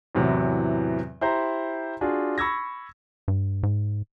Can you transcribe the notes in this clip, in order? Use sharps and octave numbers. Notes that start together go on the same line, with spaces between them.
E2 A2 C3 E3 F#3
E4 G4 C5 A#5
D4 F4 F#4 G#4
B5 C#6 E6 G#6 A#6
G2
G#2